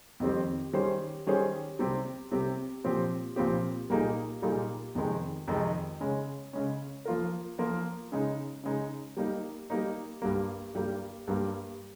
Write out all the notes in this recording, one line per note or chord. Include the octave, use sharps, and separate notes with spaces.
F2 D#3 G3 C4 G4
D#3 G3 C#4 G#4 C5
D#3 G3 C#4 G#4 C5
C3 G3 C4 G4
C3 G3 C4 G4
A#2 F3 C4 G4
A#2 F3 C4 G4
A#2 G3 A#3 D#4 G#4
A#2 G3 A#3 D#4 G#4
F2 C3 D#3 G#3 D#4
F2 C3 D#3 G#3 D#4
C#3 G#3 C#4
C#3 G#3 C#4
F3 A#3 F4 A#4
F3 A#3 F4 A#4
C#3 G#3 D#4
C#3 G#3 D#4
G3 A#3 D#4
G3 A#3 D#4
G2 G3 A#3
G2 G3 A#3
G2 G3 A#3